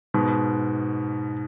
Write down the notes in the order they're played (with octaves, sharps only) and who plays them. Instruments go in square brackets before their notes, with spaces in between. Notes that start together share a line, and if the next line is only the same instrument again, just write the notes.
[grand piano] G#2 B2